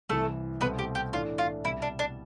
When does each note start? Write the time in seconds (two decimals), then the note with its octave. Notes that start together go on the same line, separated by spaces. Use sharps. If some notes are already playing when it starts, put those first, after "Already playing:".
0.09 C2 C3 E3 A3 A4
0.61 C2 B2 A3 B3 C4 B4
0.79 G4
0.95 G4
1.13 A2 E3 A3 D4 F4
1.38 F4
1.64 C2 B2 G3 E4
1.82 D4
1.99 D4